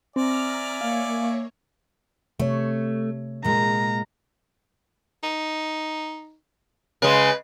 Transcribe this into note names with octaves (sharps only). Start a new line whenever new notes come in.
C4 D5 E5 G#5 A#5 F6
A#3 C#5 F5
C3 A3 C#5
A#2 G#3 A#5
D#4
C#3 G#3 B4